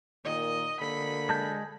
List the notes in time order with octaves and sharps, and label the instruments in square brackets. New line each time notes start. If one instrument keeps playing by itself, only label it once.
[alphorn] A#2 [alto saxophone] D#3 [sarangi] D#5
[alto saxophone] D3 [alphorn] A#3 [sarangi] B5
[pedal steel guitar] G#3 A5 G6